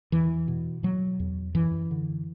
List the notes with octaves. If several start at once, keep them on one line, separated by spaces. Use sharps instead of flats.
E2 E3
B2
B2 F#3
E2
F#2 E3
D3